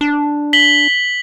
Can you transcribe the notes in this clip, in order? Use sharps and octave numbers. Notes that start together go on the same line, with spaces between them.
D4
B6 F#7 G7